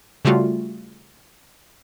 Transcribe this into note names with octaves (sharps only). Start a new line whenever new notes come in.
C#3 G3 A3 F4 F#4